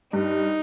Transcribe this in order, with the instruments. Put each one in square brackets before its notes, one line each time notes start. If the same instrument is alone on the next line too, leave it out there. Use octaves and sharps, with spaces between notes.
[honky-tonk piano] G2 [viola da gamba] D#4